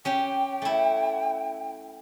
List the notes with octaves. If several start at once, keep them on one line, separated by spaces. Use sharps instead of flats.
C#4 G4 G5
A3 E4